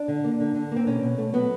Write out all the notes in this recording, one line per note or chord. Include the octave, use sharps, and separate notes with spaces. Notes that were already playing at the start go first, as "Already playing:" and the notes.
Already playing: D4
D3
A#3
D3
D3
A#3 C4
B2 C#4
B2
A3
F#3 B3